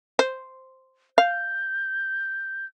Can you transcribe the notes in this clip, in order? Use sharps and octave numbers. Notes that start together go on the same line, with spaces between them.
C5
F5 G6